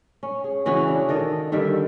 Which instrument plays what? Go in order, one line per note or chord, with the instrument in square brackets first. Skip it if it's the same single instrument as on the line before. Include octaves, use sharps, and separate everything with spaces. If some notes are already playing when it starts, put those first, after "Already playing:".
[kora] C#4
G#4
C#3 E3 C#4 F#4
D4
D#3 A4 D#5
D3 D#3 G3 E5